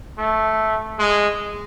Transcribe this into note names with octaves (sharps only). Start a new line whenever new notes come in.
A3
G#3